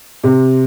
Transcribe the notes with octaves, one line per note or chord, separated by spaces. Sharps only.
C3